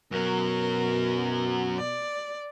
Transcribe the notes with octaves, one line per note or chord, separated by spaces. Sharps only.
F#2 B2 F#3 A#4
D5